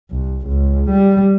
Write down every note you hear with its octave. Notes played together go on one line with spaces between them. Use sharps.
C2
C#2
G3